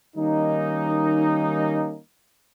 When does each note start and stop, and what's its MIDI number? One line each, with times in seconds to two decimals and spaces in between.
0.16 1.98 51
0.16 1.98 55
0.16 1.98 58
0.16 1.98 61
0.16 1.98 63